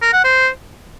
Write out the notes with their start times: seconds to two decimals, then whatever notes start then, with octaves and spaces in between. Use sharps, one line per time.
0.02 A#4
0.13 F#5
0.24 C5